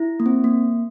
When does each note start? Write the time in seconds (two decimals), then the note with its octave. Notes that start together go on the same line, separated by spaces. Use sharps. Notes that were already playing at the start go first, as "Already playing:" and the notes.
Already playing: E4
0.20 A#3
0.26 C4
0.44 A#3